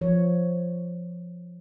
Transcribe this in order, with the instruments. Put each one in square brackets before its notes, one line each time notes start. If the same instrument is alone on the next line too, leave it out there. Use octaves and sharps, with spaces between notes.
[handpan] F3 C#5